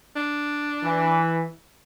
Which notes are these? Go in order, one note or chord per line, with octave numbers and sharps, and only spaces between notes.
D4
E3